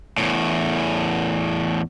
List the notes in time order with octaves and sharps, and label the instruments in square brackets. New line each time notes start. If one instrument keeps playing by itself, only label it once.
[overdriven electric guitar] E2 A2